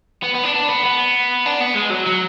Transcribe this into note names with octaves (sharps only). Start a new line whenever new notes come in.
B3
B3
D4
D4
B3
B3
D4
B3
G#3
F#3
F#3